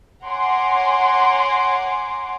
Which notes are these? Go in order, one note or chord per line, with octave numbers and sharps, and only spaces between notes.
C#5 F#5 G#5 A#5 C6 D6